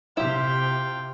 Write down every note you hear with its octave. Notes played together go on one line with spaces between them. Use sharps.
C3 E4 F4 G4 G5